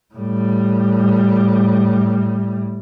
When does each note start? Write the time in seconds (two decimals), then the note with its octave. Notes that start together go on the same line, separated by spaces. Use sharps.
0.14 A2 G3